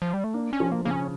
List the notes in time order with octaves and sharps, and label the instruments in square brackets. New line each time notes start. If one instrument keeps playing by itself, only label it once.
[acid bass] F3
G3
A3
[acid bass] A#3 [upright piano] D4
[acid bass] C#4
[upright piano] F3
[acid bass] A#3
[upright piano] C#3 [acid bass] A#3
[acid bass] C#4